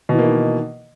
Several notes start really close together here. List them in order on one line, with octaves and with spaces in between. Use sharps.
B2 E3 A#3 D#3